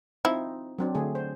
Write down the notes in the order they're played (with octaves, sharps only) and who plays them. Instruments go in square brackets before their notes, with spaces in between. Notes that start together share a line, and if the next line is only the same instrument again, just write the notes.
[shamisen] F3 E4 [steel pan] C4 D#4
[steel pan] F#3 C4 D4
D3 A3 G#4
C5